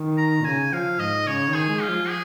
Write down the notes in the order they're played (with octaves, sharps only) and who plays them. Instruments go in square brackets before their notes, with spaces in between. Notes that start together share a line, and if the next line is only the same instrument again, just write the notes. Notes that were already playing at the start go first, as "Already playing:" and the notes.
Already playing: [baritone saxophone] D#3
[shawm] A#5
[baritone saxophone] A#2
[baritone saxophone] C#3 [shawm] G#5
[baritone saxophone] F3 [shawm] F5
[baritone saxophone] G#2 [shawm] D#5
[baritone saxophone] C#3 [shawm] C#5
[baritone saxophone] D#3
[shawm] G#4
[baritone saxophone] G#3
[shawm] F4
[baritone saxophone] F3
[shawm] G#4